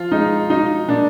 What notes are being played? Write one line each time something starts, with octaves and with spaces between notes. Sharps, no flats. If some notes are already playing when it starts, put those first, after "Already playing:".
Already playing: F3 F4
G#3 D#4
F#3 D#4
A#2 D4